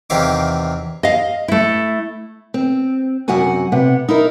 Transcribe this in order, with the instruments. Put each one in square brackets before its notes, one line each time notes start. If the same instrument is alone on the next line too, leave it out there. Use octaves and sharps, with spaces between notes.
[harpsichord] E2 C3 D#3 F5 D6
[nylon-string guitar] D#5 F5
A3 E4
[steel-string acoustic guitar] C4
F#2 C3 F#4 F#5 G#5
C3 B3 F#5
D#4 E4 A#4